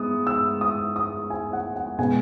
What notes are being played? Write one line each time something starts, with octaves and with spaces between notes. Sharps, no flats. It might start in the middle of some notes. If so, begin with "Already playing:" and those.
Already playing: G#3 B3 D#6
E6
D#6
D#6
G#5
F#5
F#5
B2 G#3 B3 G#5